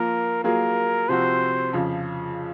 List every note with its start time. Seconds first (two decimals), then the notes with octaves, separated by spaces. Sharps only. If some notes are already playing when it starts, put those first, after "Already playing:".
Already playing: F3 A#3 F4 A#4
0.44 F#3 A#3 F4 G#4 A#4
1.09 C3 F3 C4 F#4 C5
1.73 F2 C#3 F3